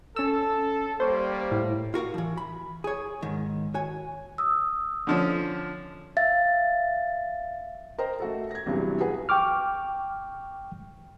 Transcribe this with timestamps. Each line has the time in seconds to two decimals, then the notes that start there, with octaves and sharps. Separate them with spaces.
0.16 C#4 A4 E6
1.00 G3 A#3 C5 C#5
1.52 A2
1.94 F4 F#4 A#4 F5
2.14 E3 F3
2.37 B5
2.84 G#4 C#5
3.22 G#2 D#3
3.74 F#4 C#5 G#5
4.38 D#6 E6
5.07 D3 F3 C#4
6.17 E5 F5 A6
7.98 A#4 C5 D#5 G5 A#5
8.20 A3 F#4 A4
8.51 G#6 A#6
8.66 E2 G2 C3 E3 F#3
9.00 G#4 B4 F#5 G#5
9.29 G5 C#6 D6 F6